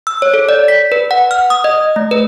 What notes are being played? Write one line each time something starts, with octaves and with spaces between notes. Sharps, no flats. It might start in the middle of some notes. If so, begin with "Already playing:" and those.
E6
C#5
A4
D5
B6
B4
F#5
F6
D#6
D#5
A3
B4